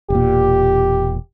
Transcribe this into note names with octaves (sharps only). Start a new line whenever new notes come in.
E1 A#2 G4